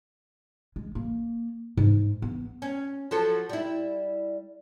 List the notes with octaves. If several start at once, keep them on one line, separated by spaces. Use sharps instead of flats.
G#3
A#3
G#2
B3
C#4
F3 F#3 A4
G3 E4